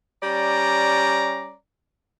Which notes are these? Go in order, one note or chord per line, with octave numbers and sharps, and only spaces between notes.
G3 C#4 D5 A#5